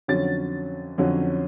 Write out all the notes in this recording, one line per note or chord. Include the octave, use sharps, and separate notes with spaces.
F2 D3 F#3 C#4 A6
F2 D3 F#3 C#4